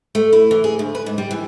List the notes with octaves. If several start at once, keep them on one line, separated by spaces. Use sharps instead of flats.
A3
E4
E3
G#4
D2
B4
G#2
G3
E3